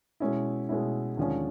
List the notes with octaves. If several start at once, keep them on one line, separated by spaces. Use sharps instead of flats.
B2 G#3 C#4 E4
B2 G#3 C#4 E4
D#2 D3 F3 G#3 C#4